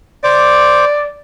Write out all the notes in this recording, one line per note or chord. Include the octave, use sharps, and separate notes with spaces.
C5 D5 D6